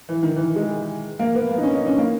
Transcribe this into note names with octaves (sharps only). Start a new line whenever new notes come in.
E3
D#3
E3
G#3
A#3
B3
A#3
D#4
C#4
D#4
C#4
A#3